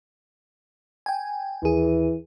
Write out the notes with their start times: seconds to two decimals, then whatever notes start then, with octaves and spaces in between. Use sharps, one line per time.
1.06 G5 G#5
1.63 D#2 E3 G#4